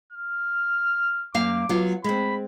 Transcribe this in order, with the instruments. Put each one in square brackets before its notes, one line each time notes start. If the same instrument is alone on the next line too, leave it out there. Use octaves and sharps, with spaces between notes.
[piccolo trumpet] F6
[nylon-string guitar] F#2 A#3 F5 [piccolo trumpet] D6
[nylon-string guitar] F#3 B3 F4
[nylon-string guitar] G#3 C4 [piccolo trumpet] B5